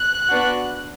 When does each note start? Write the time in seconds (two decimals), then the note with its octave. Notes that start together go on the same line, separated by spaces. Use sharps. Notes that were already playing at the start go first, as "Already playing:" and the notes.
Already playing: F#6
0.28 B3 D4 F#4